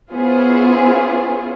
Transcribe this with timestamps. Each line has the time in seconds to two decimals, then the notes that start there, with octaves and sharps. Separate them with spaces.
0.12 B3 C#4 E4 F4 G#4 C5